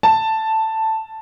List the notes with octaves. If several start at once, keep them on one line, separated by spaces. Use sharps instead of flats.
A5